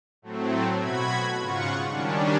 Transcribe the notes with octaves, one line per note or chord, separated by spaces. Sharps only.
A2 F#3 A3 C4
B2 F#4 B5 G#6
G#2 C#3 F4 F#5 C#6
D#3 G3 C#4 D4